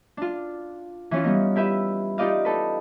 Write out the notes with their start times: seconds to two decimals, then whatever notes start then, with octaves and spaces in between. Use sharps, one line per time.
0.17 D4 F4
1.11 E3 C#4 F4
1.24 G3 B3 D#4
1.56 E4 G4 B4 E5
2.18 D#4 F4 G4 D5 D#5 F5
2.45 D#4 A4 B4